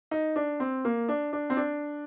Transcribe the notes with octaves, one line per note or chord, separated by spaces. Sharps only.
D#4
D4
C4
A#3
D4
D4
C4
D4